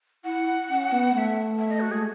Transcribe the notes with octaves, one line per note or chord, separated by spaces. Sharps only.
E4 F#5
C#4
B3
A3 E5 F#5
E5
D#5
F#4
A3 G#4